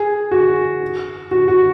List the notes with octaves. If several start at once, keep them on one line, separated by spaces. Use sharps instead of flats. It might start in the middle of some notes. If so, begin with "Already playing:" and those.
Already playing: G#4
F#4
F#4
F#4